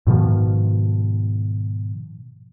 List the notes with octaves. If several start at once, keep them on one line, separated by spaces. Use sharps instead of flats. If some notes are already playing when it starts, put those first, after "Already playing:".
G#2 B2 D#3 F3